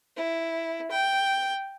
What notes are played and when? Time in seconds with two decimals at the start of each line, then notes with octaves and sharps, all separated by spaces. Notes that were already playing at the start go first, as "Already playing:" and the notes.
0.16 E4
0.91 G5